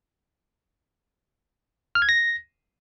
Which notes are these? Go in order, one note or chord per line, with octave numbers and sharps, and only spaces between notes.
F6
G#6
A#6